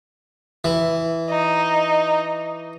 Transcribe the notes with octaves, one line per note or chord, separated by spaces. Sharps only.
E3
D#4